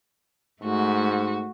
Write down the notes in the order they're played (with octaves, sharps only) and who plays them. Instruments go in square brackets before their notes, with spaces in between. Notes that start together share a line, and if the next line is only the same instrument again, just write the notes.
[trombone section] G#2 [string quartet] A3 F#4